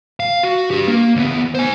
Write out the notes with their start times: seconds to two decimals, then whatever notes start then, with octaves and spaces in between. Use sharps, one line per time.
0.20 F5
0.43 F#4
0.71 D4 G4
0.88 A#3
1.16 D#2 B3
1.55 C5 G#5